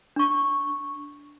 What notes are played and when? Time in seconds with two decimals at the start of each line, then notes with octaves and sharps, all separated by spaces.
0.16 D4 C#6